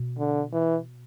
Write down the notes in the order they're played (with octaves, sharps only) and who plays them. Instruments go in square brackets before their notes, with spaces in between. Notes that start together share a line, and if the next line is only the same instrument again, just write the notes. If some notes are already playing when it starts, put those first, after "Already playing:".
Already playing: [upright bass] B2
[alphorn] D3
E3